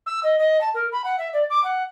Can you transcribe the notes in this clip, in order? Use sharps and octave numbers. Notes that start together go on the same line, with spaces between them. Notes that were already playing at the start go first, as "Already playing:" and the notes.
E6
D#5
D#5
A5
A#4
B5
F#5
E5
D5
D6
F#5